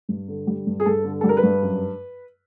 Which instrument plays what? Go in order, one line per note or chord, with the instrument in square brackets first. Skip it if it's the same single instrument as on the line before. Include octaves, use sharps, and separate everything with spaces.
[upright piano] G2
D3
G3
G2
G#4
G2 A4
D3
G3 A4
A#4
B4
G2
F#2